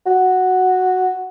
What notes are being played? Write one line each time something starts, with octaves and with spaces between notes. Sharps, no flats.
F#4